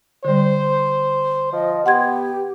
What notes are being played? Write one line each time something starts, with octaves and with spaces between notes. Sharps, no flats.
D3 G3 C5
F3 D#5
B3 G4 F#5 C6 G#6